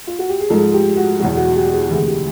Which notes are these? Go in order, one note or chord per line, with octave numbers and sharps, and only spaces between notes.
F4
F#4
G4
G#4
G#2 F3 G#3 A4
G4
F#4
E2 B2 F#3 F#4
F#4
G4
G#4
D2 C3 E3 G#3 G#4
G4